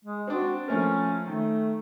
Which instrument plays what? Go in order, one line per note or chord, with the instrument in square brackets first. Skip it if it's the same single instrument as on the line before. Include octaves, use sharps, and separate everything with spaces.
[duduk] G#3
[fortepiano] C4 D4 [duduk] F#4
[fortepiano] F3 A3 A#4 [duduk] C#4
[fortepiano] D#3 [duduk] A3